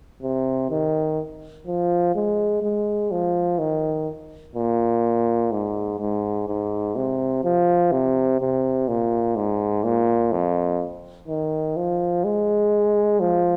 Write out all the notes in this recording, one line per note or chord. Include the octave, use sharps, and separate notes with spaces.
C3
D#3
F3
G#3
G#3
F3
D#3
A#2
G#2
G#2
G#2
C3
F3
C3
C3
A#2
G#2
A#2
F2
D#3
F3
G#3
F3